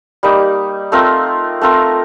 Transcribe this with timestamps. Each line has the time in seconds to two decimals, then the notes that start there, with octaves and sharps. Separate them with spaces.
0.23 G3 A#3 D#4
0.92 A3 C4 F4 A#4
1.61 A3 C4 F4 A#4